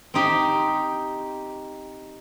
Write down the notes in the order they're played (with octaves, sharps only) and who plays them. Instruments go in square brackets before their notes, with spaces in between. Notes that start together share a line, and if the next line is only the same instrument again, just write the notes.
[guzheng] C4 D#4 G4